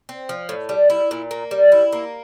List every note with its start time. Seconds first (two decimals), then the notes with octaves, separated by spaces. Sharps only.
0.09 C4
0.29 F3
0.49 A2
0.69 G3
0.90 E4
1.11 A#2
1.31 A#3
1.51 G3
1.72 E4
1.93 A#3